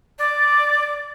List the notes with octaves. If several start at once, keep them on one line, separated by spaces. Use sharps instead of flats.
D5